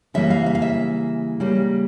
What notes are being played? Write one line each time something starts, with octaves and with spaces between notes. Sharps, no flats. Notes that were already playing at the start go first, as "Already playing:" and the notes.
C#3 E3 G3 A#3 E5
F5
E5
F5
E5
C#3 G3 A#3